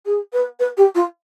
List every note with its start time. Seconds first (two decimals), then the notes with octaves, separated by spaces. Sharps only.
0.05 G#4
0.32 B4
0.59 B4
0.77 G4
0.94 F4